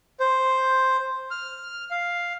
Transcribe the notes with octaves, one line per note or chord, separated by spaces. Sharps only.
C5
F6
F5